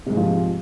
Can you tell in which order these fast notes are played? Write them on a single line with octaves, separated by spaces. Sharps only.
C3 G#2 G#3 F3